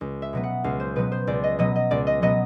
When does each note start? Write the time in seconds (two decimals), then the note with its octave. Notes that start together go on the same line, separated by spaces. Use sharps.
0.01 C#2
0.22 E5
0.33 B2 F#3 B3
0.44 F#5
0.64 C#2 F5
0.80 C5
0.96 B2 F#3 B3 B4
1.12 C5
1.27 C#2 D5
1.44 D#5
1.59 B2 F#3 B3 D#5
1.76 D#5
1.91 C#2 D5
2.07 D#5
2.22 B2 F#3 B3 D#5